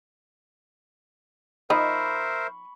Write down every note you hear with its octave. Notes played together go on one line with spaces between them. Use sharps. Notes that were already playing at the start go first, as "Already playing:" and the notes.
F3 D#4 A#4 C5 D#5 E5 B5 C#6